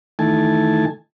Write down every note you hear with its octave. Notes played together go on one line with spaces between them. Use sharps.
D#3 E3 A3 G#5 A5